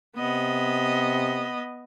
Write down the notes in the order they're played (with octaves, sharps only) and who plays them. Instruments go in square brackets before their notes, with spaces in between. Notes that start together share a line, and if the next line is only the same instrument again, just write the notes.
[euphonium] C3 [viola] B3 D#5